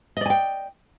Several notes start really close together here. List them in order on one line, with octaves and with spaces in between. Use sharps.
D#5 D5 G#5 G5